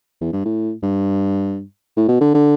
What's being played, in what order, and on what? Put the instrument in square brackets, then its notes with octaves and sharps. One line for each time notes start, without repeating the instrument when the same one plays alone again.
[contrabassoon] E2
G2
A2
G2
A2
B2
D3
D3